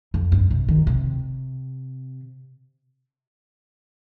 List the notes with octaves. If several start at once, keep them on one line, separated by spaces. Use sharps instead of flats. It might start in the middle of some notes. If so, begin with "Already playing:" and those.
F2
G2
C3
D#3
C3